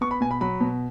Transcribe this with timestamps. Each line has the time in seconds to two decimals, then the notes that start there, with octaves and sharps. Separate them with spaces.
0.01 B3 C#6
0.11 B5
0.21 B2 G#5
0.31 B5
0.41 F#3 B5
0.60 B2